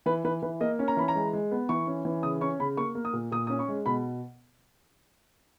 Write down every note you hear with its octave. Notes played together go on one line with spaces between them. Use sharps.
E3 B4
E3 B4
E3 B4
A#3 D#5
C#4
A#5
E3 B5
A#5
G#3
G#3
B3
E3 C#6
C#4
E3
C#3 D#6
C#4 C#6
C#3 B5
A#3 C#6
A#3
D#6
A#2
A#2 D#6
C#4 D#6
C#6
G#3
B2 B5